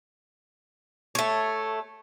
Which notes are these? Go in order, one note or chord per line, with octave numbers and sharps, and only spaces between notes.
A3 C#5